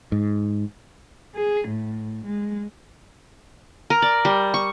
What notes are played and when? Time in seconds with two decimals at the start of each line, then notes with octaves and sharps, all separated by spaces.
0.12 G#2
1.35 G#4
1.68 A2
2.26 G#3
3.90 A#4
4.02 D5
4.25 G3
4.54 C#6